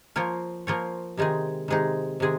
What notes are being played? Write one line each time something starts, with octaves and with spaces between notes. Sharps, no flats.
F3 A#3 F4 A#4 C#5
F3 A#3 F4 A#4 C#5
C3 D#3 G#3 D#4 G#4
C3 D#3 G#3 D#4 G#4
C3 D#3 G#3 G#4